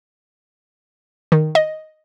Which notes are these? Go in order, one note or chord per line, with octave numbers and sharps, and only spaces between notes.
D#3
D#5